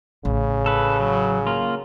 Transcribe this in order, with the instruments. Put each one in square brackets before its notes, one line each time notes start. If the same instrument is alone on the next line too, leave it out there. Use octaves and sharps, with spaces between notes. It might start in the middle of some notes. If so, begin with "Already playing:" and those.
[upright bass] A1 [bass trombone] C#3
[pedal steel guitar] A4 B4
F#3
A#3 F4